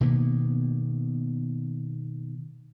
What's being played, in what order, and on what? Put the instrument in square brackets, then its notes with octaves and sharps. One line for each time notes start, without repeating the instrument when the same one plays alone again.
[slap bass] B2 D#3 A#3 B3